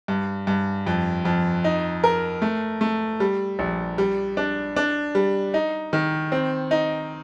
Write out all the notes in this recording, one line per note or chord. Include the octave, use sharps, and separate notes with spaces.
G2
G2
F2
F2
D#4
A#4
A3
A3
G3
A#1
G3
D4
D4
G3
D#4
D#3
C4
D#4